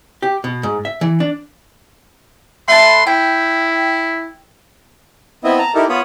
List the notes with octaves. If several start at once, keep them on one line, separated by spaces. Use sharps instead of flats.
G4
B2
G#2
E5
E3
D4
A3 B4 A5 C6
E4 G5
B3 C4 E4 D#5 E5
A5 A#5
D#4 E4 G4 A4 A#4
B3 F4 C#5 B5 D#6